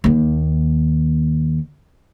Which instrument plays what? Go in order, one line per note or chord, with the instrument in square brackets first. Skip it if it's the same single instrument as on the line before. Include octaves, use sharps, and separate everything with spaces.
[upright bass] D#2 A#3